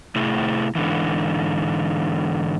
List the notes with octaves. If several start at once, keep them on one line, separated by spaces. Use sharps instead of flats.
C3 A3 E4 G#4
G#2 B2 D3 E3